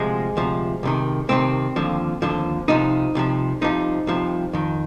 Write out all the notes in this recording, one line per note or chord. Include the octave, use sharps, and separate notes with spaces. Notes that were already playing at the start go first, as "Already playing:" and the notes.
Already playing: D2 C3 F3 G#3
D2 C3 F3
C2 C3 D#3
C2 C3 D#3 C4
D#2 D3 F3
D#2 D3 F3
C2 C3 F3 D#4
C2 C3 F3
C2 C3 F3 D#4
C2 C3 F3
F2 D#3